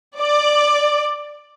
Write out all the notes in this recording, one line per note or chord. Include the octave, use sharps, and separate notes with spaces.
D5